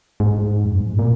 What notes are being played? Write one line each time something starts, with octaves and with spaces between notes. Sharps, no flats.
G#2
F2
G2
A2
A#2